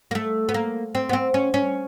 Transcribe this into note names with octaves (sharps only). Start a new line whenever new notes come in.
A#3
A3
B3
A#3
C4
B3
C4
C#4
C#4